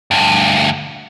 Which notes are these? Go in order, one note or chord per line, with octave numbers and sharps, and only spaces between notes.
D2 G2